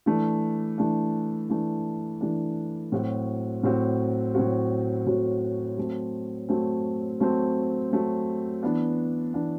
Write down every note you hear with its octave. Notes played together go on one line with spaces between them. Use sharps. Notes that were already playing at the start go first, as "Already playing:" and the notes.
E3 A3 D4
E3 A3 D4
E3 A3 D4
E3 A3 D4
A2 F#3 C4 F#4
A2 F#3 C4 F#4
A2 F#3 C4 F#4
A2 F#3 C4 F#4
F#3 A3 C4
F#3 A3 C4
F#3 A3 C4
F#3 A3 C4
E3 B3 D4
E3 B3 D4